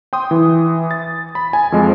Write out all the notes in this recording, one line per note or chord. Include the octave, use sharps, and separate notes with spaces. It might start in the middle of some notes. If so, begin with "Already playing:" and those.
G5 C6 D#6
E3
A6
B5
G#5
F2 F3 G#3